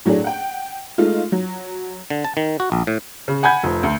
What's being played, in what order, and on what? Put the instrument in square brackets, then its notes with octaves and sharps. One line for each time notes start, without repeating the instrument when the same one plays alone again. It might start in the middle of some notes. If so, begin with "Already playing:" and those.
[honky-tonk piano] A2 F#3 A3 D4 G#4
F#5 G5
G#3 A3 D#4 F4
F#3
[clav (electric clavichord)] D3
A5
D#3
F#4
A#1
A2
[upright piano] C#3
F#5 G#5 B5 G6 G#6
F1 F3
D2